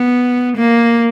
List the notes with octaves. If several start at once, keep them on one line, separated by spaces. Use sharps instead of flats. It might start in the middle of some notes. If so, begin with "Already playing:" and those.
Already playing: B3
A#3